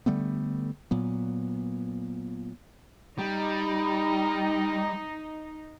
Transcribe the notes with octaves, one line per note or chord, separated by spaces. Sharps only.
D3 G3 A3 B3
A#2 F#3 B3
G3 D#4